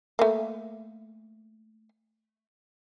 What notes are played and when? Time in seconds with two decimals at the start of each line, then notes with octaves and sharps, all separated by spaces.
0.19 A3 A#3